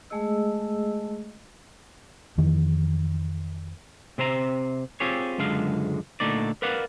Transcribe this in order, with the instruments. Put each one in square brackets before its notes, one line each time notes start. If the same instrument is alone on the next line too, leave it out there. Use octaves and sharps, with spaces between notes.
[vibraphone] G#3 A3 G#4 D#5 E6
[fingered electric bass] F2 D#3 E3
[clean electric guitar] C3 C4 C5 A#5
C4 F4 G4 G#4 C#5
C#2 F#2 D3 G#3 F5
A#2 D3 A3 D#4 D5
A#4 B4 D5 F5 F#5